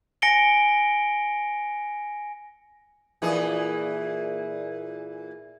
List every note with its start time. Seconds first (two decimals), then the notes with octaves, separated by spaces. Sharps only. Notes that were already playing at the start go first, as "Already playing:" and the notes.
0.22 G#5 A#6 C#7 D7 G7
3.22 A#2 E3 G#4